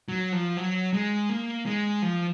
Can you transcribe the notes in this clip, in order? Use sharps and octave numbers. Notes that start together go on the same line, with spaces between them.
F#3
F3
F#3
G#3
A#3
G#3
F3